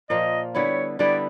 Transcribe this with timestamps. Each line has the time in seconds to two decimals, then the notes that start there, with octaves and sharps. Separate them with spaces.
0.10 A#2 F3 A#3 D#5
0.55 D3 G3 B3 E4 C#5
0.99 D3 G3 B3 E4 D5